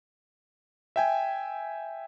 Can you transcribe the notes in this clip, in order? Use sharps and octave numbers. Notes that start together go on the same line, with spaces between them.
E5 G5 G#5